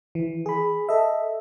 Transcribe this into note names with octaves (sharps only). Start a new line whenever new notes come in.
E3
G#4 B5
A4 D#5 E5